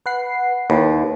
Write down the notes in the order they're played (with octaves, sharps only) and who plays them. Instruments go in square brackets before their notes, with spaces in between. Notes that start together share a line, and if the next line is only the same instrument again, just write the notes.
[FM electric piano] B4 F#5 C7
[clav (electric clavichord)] D#2 [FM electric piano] A#3 E4 B4